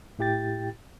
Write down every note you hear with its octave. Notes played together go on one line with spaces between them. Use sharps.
A2 E4 G4 G5 A6